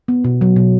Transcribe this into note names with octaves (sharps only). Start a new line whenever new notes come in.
B3
B2
F#3
B2